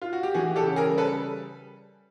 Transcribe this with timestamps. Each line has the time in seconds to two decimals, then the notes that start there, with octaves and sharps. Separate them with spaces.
0.02 F4
0.13 F#4
0.23 G4
0.35 E3 F#4 G#4
0.56 G4 A4
0.63 C#3
0.76 G#4 A#4
0.91 G3
0.98 A4 B4